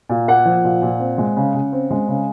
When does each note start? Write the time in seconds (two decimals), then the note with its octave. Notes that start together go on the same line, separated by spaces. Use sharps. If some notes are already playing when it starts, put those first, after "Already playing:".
0.09 A#2
0.28 A#3 F#5
0.45 F3
0.64 A#2
0.82 A#2
1.00 C4
1.18 G#3
1.37 C#3
1.54 C#3
1.73 C4
1.91 G#3
2.08 C#3